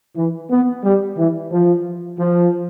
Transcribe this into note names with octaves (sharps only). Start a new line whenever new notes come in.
E3
B3
G3
E3
F3
F3